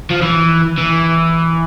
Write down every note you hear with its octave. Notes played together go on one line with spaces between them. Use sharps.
F3
E3
E3